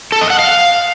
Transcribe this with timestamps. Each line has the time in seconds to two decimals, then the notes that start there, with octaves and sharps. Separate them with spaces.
0.12 A4
0.21 D#5
0.30 F#5
0.39 F5